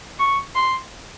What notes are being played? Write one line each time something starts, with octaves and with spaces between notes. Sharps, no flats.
C#6
C6